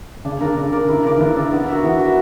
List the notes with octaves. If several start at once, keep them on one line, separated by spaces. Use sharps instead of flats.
C#3 D4
D3 A#4 D5
C#3 D4
A#4 D5
D3 E4
C#3 A#4 D5
E3
D3 E4
A#4 D5
B3
F#4 A#4 E5
E3 B3
F#4 A#4 E5